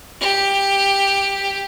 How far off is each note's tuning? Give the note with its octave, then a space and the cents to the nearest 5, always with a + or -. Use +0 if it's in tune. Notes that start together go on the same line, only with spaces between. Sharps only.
G4 +10